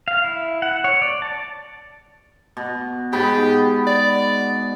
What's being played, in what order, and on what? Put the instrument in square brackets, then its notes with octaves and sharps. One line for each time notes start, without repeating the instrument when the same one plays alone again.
[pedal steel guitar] F5
E4
F#5
C#5
D5
A5
[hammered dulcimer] B2
[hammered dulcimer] G#2 B3 B5 [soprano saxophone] G4
[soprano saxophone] D5